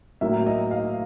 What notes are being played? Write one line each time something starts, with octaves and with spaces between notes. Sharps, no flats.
A2 F#3 A#3 E5
D#5
F5